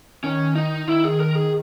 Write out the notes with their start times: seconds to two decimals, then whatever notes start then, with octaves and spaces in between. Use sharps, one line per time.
0.24 D#3 C#4
0.56 D#4
0.88 D#3 E4
1.04 G#4
1.20 A#4
1.35 G#4